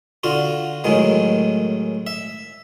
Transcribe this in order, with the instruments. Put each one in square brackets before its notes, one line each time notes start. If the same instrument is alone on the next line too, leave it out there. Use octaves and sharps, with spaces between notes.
[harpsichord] D3 F4 F#4
F#2 A2 D#3 G#3
E5